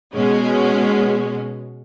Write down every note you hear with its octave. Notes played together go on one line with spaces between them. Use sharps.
B2 G#3 C#4